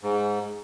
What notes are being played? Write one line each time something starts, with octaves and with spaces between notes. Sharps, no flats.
G#2